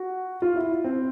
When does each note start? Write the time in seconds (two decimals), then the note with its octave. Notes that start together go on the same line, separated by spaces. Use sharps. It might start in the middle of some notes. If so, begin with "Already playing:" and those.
Already playing: F#4
0.42 F4
0.56 E4
0.84 C4